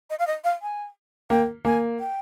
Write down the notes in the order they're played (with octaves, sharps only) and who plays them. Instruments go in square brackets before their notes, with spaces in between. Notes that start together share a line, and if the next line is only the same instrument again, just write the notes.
[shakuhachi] D#5
F5
D#5
F5
G#5
[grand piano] A#3 [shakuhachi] G5
[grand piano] A#3 [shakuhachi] G#5
[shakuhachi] G5